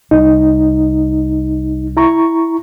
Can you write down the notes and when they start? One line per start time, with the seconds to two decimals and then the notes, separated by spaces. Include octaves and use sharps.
0.11 C2 D#4
1.97 E4 A#5 C#6